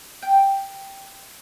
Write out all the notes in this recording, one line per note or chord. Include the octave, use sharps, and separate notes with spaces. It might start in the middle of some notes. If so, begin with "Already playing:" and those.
G5